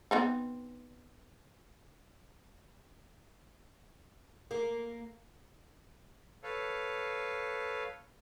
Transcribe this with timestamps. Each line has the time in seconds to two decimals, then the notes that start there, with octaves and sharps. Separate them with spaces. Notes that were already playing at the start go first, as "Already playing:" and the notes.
0.11 B3 C4 D#4
4.51 A#3
6.43 A4 B4 C#5 F5